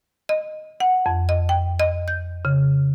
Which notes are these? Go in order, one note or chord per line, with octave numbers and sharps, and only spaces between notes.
D#5
F#5
F2
D#5
G5
D#5
G6
C#3